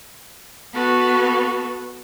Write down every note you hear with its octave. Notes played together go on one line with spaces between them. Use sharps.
B3 F#4 A4 B4